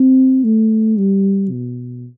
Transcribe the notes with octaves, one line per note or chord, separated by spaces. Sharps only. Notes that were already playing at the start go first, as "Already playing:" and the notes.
Already playing: C4
A3
G3
B2